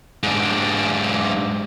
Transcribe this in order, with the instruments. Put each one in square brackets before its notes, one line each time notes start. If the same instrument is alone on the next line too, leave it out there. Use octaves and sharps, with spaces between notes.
[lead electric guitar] G#2 D4